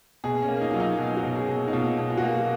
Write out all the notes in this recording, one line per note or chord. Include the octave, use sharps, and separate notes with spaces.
B2 G#4
C#4
A#3
D#4
F#3 F4
D#4
B2 F4
F#4
B2
G#4
B2
D#4
B2 F4
B2
F4
F#4
A#3 F4